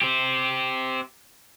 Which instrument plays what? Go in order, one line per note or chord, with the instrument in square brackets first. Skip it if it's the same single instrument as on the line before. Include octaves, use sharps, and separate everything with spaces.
[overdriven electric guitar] C4 G4